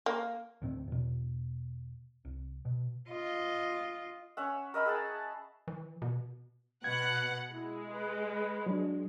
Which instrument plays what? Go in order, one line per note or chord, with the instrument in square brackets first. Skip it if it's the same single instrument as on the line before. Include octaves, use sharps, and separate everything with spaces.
[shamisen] A#3
[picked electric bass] D2 A2 C4
E2 B2
C2
B2
[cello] F4 D#5
[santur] C#4 E5 F#5
A#4 D#5 E5 B5
G#4 F#5 A5
[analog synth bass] E3
B2
[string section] B2 F#5 F#6 [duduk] B4 [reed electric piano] G#6
[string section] G#3 [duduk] E4
[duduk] B4
[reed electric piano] F#3 D4